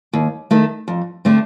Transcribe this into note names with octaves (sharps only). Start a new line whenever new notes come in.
D#2
D#3 A3
F2
D3 A3 C4